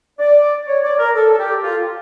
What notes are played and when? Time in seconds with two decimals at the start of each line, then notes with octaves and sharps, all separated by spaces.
0.19 D5
0.67 C#5
0.83 D5
0.99 A#4
1.15 A4
1.33 A4
1.39 G4
1.63 F4